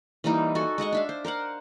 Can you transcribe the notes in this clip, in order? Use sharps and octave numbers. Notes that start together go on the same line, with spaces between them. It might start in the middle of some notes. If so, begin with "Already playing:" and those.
E3 G3 A#3 D#4
F#4 A4 G#5
G#3 D#5 F#5 C#6
D4 E5 F5
C5
A#4 C5 F5 F#5